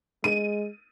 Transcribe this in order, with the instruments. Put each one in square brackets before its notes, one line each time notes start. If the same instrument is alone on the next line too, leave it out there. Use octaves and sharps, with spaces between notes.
[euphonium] G#3 [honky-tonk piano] D#7